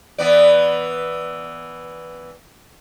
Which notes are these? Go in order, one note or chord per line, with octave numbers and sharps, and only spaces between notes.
E3 B3 D5